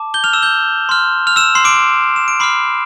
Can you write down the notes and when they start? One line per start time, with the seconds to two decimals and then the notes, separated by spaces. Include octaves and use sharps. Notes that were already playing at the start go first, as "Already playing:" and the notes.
Already playing: A5 D6
0.14 G6 G7
0.24 F6 F7
0.33 E6 E7
0.42 G6 G7
0.89 C6 F6
1.27 F6 F7
1.36 E6 E7
1.55 C6 C7
1.64 D6 D7
2.16 E7
2.28 D7
2.40 B5 C6 D6 F6 C7